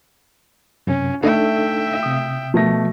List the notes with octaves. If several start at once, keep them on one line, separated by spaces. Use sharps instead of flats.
F#2 C3 C#4
A3 D4 D#4 A4 E5 G5
C3 D#6
B2 F3 A3 A#6